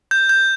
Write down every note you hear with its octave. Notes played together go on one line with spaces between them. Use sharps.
G6
G6